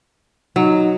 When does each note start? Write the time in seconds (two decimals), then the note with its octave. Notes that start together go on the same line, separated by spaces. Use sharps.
0.56 F#3 D#4